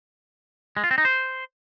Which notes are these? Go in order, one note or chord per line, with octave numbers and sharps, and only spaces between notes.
G#3
F4
C4
D#4
C5